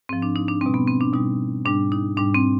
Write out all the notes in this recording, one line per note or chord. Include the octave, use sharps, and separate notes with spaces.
G#2 F3 C4
D4
D#4
D4
B2 G3 C4
B3
C4
D4
B2 G3 D#4
G#2 G3 D4
D#4
G#2 G3 D4
C4